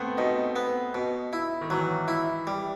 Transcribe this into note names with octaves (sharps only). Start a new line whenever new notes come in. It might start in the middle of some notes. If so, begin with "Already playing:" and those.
Already playing: A3 B3 C4
B2 D#4
B3
B2
E4
D#3
E3 F#3
E4
G3